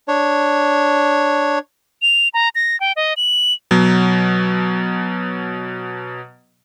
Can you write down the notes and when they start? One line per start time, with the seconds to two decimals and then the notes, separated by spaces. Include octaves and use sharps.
0.08 D4 C#5
2.02 F7
2.34 A#5
2.55 A#6
2.80 G5
2.96 D#5
3.17 F#7
3.71 B2 F#3